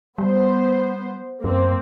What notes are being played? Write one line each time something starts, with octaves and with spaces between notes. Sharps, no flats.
G3 B3 C5
F#2 A#3 C4